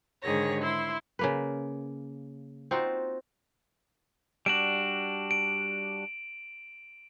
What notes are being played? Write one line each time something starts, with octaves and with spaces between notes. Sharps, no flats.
G#2 D3 D#3 G#4 C#5 A#6
E4 C6
C#3 A#3 B4
C4 D#4 F4 F#4
G3 D4 F#4 D7 E7 F#7
D7